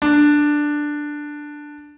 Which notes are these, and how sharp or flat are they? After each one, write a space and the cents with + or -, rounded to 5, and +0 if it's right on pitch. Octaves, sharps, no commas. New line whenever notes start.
D4 +5